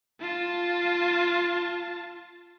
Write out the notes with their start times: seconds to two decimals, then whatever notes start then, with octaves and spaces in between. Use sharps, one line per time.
0.21 F4 A5